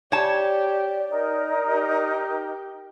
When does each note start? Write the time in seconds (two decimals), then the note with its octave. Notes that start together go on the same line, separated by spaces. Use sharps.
0.12 G4 C#5 D5 A5
1.08 D#4 A#4
1.68 G4